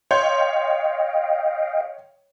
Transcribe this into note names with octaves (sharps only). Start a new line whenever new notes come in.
C#5 D#5 F5 G5 C6 G6